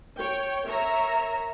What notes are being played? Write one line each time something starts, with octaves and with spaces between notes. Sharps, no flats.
C#5 G5
A#4 C#5 E5 A#5